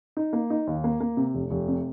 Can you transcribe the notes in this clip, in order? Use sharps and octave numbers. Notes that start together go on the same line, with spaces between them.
D#4
A#3
D#4
D#2
A#3
A#3
C3
F1
F1
C3